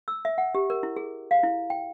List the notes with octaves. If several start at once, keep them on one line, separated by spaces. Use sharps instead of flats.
E6
E5
F#5
G4
A#4
E4
G#4
F5
E4
G5